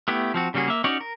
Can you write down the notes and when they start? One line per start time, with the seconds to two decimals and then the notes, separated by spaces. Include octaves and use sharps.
0.08 A3 B3 E4 G4
0.34 F3 C4 F#4
0.54 C#3 G3 A#3 F#4 G#4
0.68 A#3 E5
0.84 C#4 D#4 F#4 C#5 D5
1.01 A#4